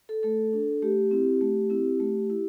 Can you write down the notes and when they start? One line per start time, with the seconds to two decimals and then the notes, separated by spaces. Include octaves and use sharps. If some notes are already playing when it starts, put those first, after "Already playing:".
0.09 A4
0.23 A3 A4
0.53 D4
0.82 A3 G4
1.11 C4 E4
1.41 A3
1.70 C4 E4
2.00 A3
2.30 E4